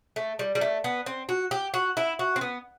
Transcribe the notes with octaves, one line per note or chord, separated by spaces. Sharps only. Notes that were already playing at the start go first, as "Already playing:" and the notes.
A3
G3
G3
A3
B3
C4
F#4
G4
F#4
E4
F#4
C4
B3